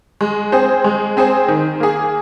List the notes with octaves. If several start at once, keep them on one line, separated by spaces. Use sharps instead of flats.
G#3
C4 G#4 C5
G#3
C4 G#4 C5
D#3
A#3 G#4